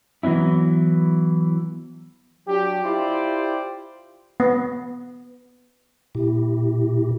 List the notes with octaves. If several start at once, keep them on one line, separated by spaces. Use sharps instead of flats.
E3 F#3 B3 C#4 E4
F#3 D4 G4
E4 F4 G4 C5 D5
B3
A#2 E4 G4